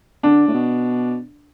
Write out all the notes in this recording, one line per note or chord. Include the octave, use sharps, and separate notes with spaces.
D3 D4
A2
B2